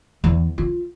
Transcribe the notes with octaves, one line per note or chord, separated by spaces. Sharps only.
E2
F4